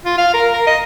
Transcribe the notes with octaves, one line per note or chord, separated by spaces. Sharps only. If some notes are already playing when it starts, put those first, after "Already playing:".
F4
F5
A#4
A#4
D#5